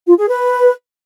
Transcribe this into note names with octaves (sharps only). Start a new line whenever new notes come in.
F4
G#4
B4